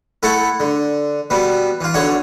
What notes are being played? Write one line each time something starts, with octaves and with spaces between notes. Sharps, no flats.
A3 E4 A4 F#5
D3
B2 G3 B3
E3 F4
B1 D3 C#5 F#5